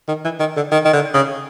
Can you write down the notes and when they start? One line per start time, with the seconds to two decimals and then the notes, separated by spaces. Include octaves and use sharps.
0.08 D#3
0.25 E3
0.40 D#3
0.56 D3
0.71 D#3
0.85 D#3
0.93 D3
1.14 C#3